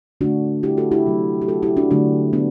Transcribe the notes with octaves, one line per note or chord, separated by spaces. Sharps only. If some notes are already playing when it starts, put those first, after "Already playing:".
D3 A3 D4 F#4
E4 G4
F#4 A4
E4 G4
C3 F#3 A3
G4
F#4 A4
E4 G4
D4 F#4
D3 F#3 A3 D4 F#4
B3 D4